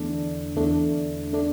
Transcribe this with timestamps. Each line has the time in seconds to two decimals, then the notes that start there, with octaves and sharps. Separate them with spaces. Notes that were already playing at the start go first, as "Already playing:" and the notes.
Already playing: E2 D3 A3 D4
0.56 E2 D3 A3 D4
1.33 D3 A3 D4